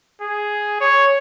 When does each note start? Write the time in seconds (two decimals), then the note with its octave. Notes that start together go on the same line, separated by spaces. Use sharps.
0.22 G#4
0.81 C#5